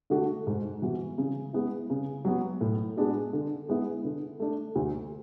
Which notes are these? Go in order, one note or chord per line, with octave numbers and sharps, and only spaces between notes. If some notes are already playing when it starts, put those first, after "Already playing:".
D3 A3 D4 F#4
G#2
E3 B3 F#4
C#3
G#3 B3 E4
C#3
F#3 B3
A2
G#3 B3 D4 F#4
D3
G#3 B3 E4
D3
A3 D4
D2